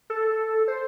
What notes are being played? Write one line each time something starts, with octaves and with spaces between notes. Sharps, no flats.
A4
C5